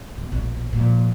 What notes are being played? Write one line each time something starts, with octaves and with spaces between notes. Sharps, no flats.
B2
A#1 B2
A#2 F3